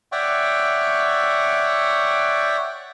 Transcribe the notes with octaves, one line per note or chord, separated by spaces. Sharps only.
C#5 D5 E5 F#5 G5 C#6